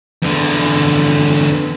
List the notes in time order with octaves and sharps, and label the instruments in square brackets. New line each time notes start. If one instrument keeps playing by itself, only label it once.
[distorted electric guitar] E2 D3